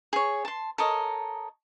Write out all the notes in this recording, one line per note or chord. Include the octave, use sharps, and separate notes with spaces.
G#4 C#5
A5 C6
A4 A#4 C#5 D#5